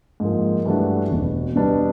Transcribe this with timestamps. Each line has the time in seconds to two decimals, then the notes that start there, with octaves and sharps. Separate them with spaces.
0.20 G#2 F3 A#3
0.66 G2 E3 A3 D4 F#4
1.11 E1 E2 B2
1.56 B2 G3 B3 D4